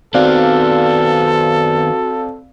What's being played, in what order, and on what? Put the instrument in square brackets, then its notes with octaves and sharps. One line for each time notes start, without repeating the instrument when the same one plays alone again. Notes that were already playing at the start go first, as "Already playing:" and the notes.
[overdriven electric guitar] D#3 B3 [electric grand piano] C4 D5 F5 [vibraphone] F#4 [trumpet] A4